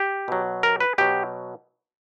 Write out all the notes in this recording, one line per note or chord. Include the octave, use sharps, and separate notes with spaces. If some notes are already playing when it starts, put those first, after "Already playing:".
Already playing: G4
B2 F#3
A#4
B4
B2 F#3 G4